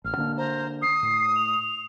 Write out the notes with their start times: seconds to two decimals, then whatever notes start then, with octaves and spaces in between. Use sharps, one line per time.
0.04 A1 F6
0.17 D3 A#3 D4
0.37 C5 A#5
0.82 D#6 C7
1.03 A2
1.35 F7